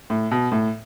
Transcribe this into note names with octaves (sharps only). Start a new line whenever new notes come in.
A2
B2
A2